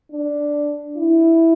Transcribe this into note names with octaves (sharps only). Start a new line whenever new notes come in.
D4
E4